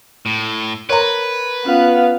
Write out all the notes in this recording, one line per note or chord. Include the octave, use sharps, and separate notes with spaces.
A2
A#4 B4 C#5 A#5 C6
B3 C#4 F4 F5